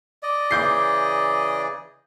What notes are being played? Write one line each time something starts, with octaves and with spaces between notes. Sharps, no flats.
D5 D#5
C#3 E3 G#4 D6 G6 C7